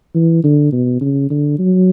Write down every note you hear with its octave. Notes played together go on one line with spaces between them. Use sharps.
E3
D3
B2
C#3
D3
F#3